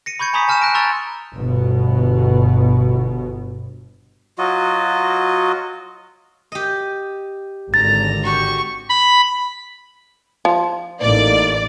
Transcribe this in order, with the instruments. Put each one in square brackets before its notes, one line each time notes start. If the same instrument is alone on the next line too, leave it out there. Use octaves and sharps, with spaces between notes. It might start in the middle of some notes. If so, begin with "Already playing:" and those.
[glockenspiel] A#6 C#7 D#7
B5 C#6 G6 G#6 C#7
G#5 A#5 B5 C#6 D#6 B6
G#5 A5 F6 G6 C#7 E7
F#6 A#6 D7
A#5 C6 C#6 E6 A6 F7
[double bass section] G1 B2
[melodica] F#3 F4 F#4 D#5
[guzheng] G4 D#5
[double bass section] G#1 D3 [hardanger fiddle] A#5 [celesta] A6
[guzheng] F#4 G4 [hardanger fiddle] C#6
[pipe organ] B5
[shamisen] F3
[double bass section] A1 [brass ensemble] A2 A#3 D#4 [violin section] D5